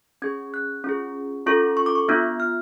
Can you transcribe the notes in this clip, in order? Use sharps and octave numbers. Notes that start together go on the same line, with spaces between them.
C#4 G#4 G#6
F#6
C#4 F4 G#4
C#4 F4 A4 C#6
C#6
D6
C#6
B3 D4 F4
F6